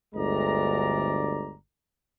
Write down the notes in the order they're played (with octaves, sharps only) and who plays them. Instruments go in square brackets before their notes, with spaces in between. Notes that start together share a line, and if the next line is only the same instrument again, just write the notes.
[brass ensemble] G1 D2 G#3 D5 A#5